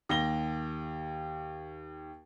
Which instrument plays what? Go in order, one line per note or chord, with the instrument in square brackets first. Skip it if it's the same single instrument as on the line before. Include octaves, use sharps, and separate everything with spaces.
[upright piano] D#2 A#6 G7